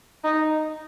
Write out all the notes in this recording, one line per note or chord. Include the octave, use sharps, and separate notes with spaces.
D#4